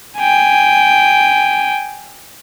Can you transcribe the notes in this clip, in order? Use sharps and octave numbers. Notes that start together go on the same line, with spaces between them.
G5 G#5